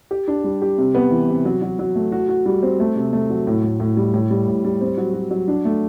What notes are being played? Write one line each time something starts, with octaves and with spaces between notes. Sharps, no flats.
G4
D4
G3
G4
C3
B3
E3
C3
F#3
F#3
F#3
A3
F#4
F#4
G3
C4
A3
C3
A3
F#3
A2
A2
A2
G3
A2
G3
A2
G3
C4
F#3
F#4
F#3
D4
A3